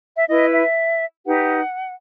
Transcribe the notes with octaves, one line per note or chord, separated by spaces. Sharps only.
E5
E4 B4 D#5
E5
D#4 G4 B4 F#5